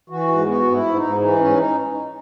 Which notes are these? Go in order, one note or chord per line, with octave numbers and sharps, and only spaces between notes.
E3 F#4
G#2
B3 F#4
G#2
E4
G#2
D#4
G#2
E3 D#4
G#2 C#4
D#4